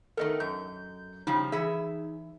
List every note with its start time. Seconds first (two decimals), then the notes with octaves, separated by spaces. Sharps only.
0.17 D#3 A3 B3 A4 A#4 D#5
0.40 F#2 G6
1.27 C#3 F3 G3 D#4
1.52 E3 G#4 E5